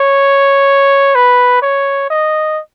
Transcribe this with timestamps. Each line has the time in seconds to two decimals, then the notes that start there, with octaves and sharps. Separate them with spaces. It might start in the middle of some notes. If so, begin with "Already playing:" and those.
Already playing: C#5
1.15 B4
1.62 C#5
2.10 D#5